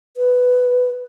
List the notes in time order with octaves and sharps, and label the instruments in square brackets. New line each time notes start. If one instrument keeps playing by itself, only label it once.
[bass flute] B4